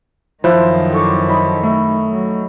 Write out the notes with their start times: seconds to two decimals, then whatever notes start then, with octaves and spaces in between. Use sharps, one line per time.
0.44 F#2 D#3 F3 E4 C5 F#6
0.93 A4 C#6 D6
1.29 D#4 B5
1.63 A3
2.11 F#3